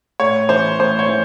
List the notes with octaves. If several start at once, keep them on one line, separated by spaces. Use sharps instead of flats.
A2 C#5
E3 C5
A2 C5
C#5
E3